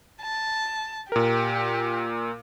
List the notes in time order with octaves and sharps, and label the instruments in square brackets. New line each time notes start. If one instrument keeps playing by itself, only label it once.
[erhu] A5
[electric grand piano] A#2 A#4 [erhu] G4